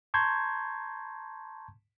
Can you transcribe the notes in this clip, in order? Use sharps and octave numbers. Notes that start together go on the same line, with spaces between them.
A5 A#5 C6 C#6 G6 G#6